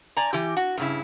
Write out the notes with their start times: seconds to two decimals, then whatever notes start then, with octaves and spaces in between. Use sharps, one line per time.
0.17 D5 G#5 A#5
0.33 E3 G4
0.57 F#4
0.77 G2 C#3 E4